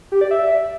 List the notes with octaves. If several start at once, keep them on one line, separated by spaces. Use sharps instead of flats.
G4
D5
E5